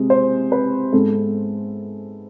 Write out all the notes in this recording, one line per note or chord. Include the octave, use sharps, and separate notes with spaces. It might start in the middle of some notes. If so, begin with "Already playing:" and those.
Already playing: C3 G#3
C5
B4
G#2 G#3 B3 A4